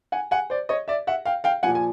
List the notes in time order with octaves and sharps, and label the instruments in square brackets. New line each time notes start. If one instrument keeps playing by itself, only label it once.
[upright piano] F#5 G#5
F#5 G#5
C5 D5
C#5 D#5
D5 E5
E5 F#5
F5 G5
F5 G5
A#2 F3 F#5 G#5
G#5